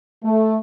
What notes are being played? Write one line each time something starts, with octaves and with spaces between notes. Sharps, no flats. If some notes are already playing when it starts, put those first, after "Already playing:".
A3